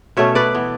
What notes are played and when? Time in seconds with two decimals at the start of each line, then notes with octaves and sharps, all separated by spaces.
0.17 B2 A3 C#4 C#5 E5
0.35 B4 D5
0.55 E3 B3